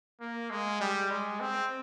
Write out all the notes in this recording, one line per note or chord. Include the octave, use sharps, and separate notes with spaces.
A#3
G#3
G3
G#3
C4